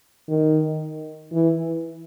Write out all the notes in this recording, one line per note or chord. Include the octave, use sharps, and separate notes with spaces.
D#3
E3